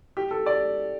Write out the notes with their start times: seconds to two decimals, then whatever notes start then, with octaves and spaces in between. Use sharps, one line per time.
0.17 G4
0.31 A4
0.46 D5